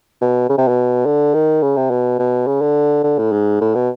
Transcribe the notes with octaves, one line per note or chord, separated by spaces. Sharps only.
B2
C#3
C3
B2
D3
D#3
C#3
C3
B2
B2
C#3
D3
D3
A2
G#2
A2
B2